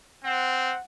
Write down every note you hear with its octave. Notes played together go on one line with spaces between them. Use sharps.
C4 F#5